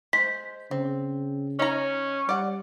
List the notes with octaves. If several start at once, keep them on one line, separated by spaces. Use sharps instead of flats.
G#3 C5 B6
C#3 C4
C#4 D#4 A#5
G3 D5 F#5